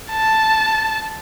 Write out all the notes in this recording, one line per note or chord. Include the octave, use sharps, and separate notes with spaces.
A5